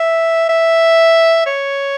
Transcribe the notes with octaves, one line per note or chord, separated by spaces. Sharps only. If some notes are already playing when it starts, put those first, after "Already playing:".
Already playing: E5
E5
C#5